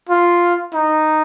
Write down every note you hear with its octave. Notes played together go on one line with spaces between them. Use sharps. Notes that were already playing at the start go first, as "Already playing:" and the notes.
F4
D#4